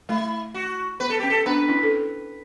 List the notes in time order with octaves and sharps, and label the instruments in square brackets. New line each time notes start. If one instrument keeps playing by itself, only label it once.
[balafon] A3 [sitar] E4
[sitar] F#4
[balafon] B3 [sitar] B4
[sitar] A4
[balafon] C#4 [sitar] G4
[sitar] A4
[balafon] B3 D4 [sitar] B4
[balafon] C#4 E4
A4